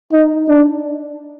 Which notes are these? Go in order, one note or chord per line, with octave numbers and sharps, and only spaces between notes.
D#4
D4